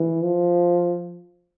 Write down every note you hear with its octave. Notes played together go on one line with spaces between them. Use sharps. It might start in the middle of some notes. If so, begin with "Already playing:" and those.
Already playing: E3
F3